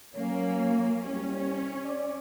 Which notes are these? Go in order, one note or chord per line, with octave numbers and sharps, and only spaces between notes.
F#3 A#3 C#4 C#5
C2 G3 C#4
D5